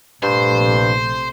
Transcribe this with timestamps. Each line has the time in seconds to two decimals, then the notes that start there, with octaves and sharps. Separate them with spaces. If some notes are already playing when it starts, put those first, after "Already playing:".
0.23 A#1 G2 C3 A3 C5